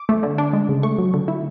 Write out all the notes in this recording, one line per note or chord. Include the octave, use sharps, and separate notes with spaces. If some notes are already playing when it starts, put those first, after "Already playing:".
Already playing: D6
A3
D3
D4
G#3
C#3
A3 C#6
F#3
D3
E4